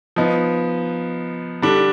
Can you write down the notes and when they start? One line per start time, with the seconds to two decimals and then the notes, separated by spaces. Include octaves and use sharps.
0.16 F3 B3 D#4
1.62 D3 G3 D4